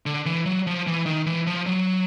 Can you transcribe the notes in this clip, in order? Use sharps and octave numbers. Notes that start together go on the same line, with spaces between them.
D3
E3
F#3
F3
E3
D#3
E3
F3
F#3